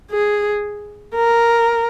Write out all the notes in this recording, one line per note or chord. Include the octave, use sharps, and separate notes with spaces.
G#4
A#4